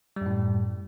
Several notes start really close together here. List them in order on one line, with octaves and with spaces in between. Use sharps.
G3 F#2 A2